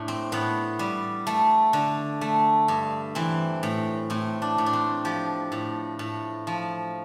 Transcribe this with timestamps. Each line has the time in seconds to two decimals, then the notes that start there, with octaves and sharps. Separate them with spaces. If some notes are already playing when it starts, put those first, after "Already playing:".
Already playing: A2 D4
0.08 C4
0.32 A2 B3
0.79 G3
1.27 A3
1.73 D3
2.21 A3
2.68 G2
3.15 E3 C4
3.63 A2
4.10 A2 C4
4.42 D4
4.58 A2
4.66 D4
4.73 C4
5.05 F3 G4
5.52 A2
5.99 A2
6.47 F3